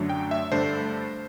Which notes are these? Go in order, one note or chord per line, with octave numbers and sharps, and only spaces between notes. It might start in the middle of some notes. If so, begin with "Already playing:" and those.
Already playing: F#2 D3 F#3 A3 D4
G5
E5
G2 D3 A3 D4 C5